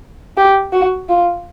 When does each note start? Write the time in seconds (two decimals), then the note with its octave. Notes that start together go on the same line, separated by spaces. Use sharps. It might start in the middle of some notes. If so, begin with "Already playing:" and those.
0.37 G4
0.73 F#4
1.09 F4